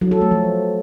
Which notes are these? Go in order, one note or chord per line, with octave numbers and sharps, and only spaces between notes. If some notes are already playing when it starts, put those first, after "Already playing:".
F#3
A4
A3
F3